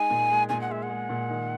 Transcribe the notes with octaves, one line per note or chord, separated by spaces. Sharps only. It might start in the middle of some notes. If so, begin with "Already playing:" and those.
Already playing: G#3 D#4 G#5
A#2
G#3
A#2 G#5
F#5
G#3 E5
F#5
G#3
A#2
D#3